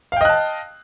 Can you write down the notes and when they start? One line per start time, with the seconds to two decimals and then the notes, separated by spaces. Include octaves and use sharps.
0.12 F5
0.16 G5
0.21 D#5
0.25 F#6
0.29 A5